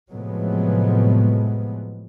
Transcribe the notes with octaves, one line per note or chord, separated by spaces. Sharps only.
A2 C3 F3 F#3 G#3 B3